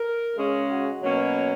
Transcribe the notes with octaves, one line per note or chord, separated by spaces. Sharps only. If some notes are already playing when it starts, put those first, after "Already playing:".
Already playing: A#4
C#3 G#3 C#4
F#4
B2 F#3 A#3 C#4